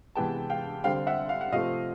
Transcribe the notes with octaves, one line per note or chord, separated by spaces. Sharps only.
C3 E3 G#3 B3 G5 A5
F5 G5
D3 G3 C4 F5 G5
E5 F#5
F5
F#5
C3 F3 A3 C4 D#5 F5